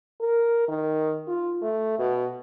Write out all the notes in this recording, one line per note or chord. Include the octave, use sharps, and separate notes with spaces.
A#4
D#3
F4
A3
B2